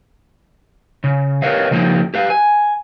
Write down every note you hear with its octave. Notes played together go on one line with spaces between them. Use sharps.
C#3
G4 A#4 B4 C#5 D#5 F5
C#3 F3 A#3 D4 D#4 G4
G4 B4 F5
G#5